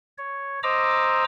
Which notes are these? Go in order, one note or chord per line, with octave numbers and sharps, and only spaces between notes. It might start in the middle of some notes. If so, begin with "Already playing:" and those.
C#5
C5 D#5 A#5 D6 E6